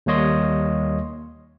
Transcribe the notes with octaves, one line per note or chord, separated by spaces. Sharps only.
D#2 G3 A#3 C#5 D#5 C6